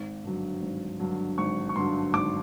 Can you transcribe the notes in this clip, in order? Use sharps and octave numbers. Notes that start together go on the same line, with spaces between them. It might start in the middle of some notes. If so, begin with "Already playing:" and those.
Already playing: G#1
G2 D3 F#3
G#1
G2 D3 F#3
G#1 C#6
C#6
G2 D3 F#3 C6
G#1 D6